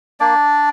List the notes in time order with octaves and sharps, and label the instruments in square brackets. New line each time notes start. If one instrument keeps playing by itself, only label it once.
[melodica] A#3 D4 D5